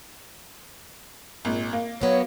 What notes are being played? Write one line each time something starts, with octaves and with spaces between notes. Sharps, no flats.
G#1 A#2
A#3
F#3 B3 C#5